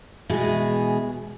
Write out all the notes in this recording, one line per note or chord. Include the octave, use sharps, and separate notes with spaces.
B2 E3 G#3 G#4